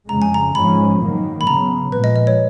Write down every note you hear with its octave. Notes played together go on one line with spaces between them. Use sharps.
F2 C#3 G#3 A#5
G#5
A#5
G#2 F3 G#3 C#4 B5
G#2 D#3 F#3 A#3
B5
C#3 F#3 B3 A#5
A#2 F3 G#3 B4
D#5
D#5
C#5